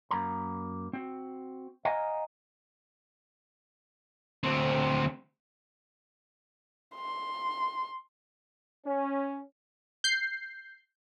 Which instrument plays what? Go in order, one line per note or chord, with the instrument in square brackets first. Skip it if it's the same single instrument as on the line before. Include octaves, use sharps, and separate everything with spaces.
[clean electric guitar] F#2 A#3 A#5 B5
C4 F#4
D#5 F5 F#5 G#5 A#5
[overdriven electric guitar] D2 C4
[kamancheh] C6
[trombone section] C#4
[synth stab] G6 C7